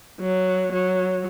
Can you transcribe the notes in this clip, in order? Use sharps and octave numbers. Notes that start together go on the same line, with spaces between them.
F#3
F#3